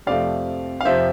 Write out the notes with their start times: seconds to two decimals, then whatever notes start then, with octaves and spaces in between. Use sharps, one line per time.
0.07 F2 C3 F3 A3 D5 F5
0.81 F5
0.85 F2 C3 F3 C5 E5